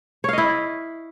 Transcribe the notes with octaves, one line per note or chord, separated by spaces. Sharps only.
E4 C#5 D#5 F5